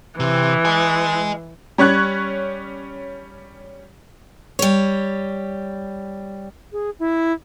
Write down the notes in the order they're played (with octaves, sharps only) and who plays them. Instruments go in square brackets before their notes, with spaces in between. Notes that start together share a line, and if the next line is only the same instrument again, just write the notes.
[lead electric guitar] C3 [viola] E3
[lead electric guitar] D#5 G#5
[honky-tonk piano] G3 C#4 C#6 F#6 G#6
[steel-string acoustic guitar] G3 C#5
[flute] G#4
E4